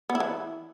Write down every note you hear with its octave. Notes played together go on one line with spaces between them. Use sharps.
B3
E4
E3